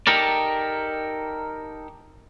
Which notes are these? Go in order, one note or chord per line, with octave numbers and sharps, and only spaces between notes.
D#4 G4 A4 A#4 D5